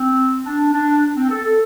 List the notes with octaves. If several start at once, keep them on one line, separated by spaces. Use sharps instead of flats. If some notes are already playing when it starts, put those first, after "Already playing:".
Already playing: C4
D4
D4
C4
A4
A4